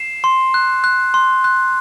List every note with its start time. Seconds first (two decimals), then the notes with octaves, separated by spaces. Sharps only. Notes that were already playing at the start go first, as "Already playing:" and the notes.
Already playing: C7 E7
0.24 C6
0.54 F#6
0.84 F#6
1.14 C6
1.44 F#6